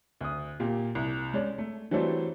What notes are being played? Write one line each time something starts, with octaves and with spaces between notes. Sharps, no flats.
D2 D#6
A#2 A#3 G4
C2
G#3 C#4 D5
A3
E3 F#3 G3 A3 C4 D4